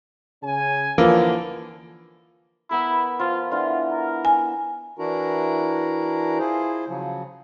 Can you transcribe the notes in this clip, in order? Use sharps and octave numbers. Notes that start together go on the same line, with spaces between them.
C#3 C#4 G#5
D3 E3 F3 A#3
B3 E4 A#4
F3 F4
D3 E3 F4 B4
A#4
G#5
E3 D4 E4 F#4 A#4 A#5
E4 F4 G#4 C5
C#3 F3 F#3